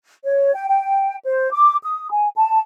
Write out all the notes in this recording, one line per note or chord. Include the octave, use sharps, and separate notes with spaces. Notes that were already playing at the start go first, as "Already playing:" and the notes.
C#5
G5
G5
C5
D6
D#6
G#5
A5